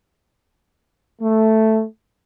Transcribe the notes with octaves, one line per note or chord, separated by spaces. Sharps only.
A3